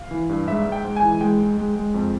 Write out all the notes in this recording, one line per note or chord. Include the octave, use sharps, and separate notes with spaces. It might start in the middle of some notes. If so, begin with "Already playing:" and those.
Already playing: F5
E3
G2
G#2 E5
G#2
G5
G#2
G#5
E3
G#3 G5
G#2
G#3
G#3
F2